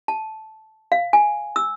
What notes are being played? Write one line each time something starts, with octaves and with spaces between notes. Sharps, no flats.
A5
F5
G#5
E6